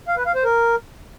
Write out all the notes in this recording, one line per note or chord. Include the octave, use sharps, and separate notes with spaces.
F5
B4
F5
C5
A#4